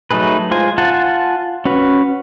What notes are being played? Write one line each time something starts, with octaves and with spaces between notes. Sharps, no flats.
F#3 A3 D#4 G#4 B4
G#3 F4 C5 G#5
F4 F#5 G#5 A5
C#4 F#4 B4